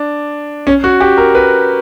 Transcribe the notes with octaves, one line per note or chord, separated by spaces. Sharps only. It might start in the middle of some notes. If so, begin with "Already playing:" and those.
Already playing: D4
C#4
F#4
G4
A#4
B4